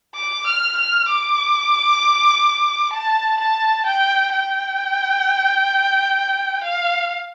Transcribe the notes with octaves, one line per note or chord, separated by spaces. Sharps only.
D6
F6
F6
D6
A5
A5
G5
G5
F5